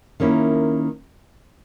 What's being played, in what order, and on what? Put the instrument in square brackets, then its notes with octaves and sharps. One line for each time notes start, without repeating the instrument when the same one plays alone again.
[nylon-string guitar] D#3 A#3 C#4 E4